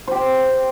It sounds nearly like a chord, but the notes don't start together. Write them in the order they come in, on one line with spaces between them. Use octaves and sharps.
C5 G4 G5